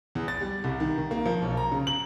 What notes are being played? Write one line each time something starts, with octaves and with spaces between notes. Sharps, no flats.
E2
A6
G3
C2
D#3
D#3
A#3
F3
B1
A#5
C#3
F#7